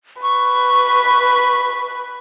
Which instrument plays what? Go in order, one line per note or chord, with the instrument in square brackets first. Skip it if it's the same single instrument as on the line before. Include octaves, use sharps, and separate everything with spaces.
[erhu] B4 [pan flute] C#6